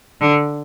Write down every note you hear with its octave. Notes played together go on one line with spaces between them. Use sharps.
D3